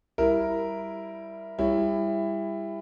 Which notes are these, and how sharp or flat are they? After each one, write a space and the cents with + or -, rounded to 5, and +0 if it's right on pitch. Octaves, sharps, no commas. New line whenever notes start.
G3 +0 E4 +5 A#4 +0
G3 +30 E4 +10 C#5 +0